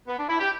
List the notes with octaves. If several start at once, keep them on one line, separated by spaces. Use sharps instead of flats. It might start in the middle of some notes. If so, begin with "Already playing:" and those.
B3
D4
E4
G4